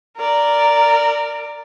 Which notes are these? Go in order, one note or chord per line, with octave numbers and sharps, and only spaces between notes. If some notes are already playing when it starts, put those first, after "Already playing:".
A#4 D5